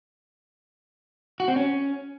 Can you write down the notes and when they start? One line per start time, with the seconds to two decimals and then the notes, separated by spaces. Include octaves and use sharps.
1.40 F#4
1.48 C4
1.56 C#4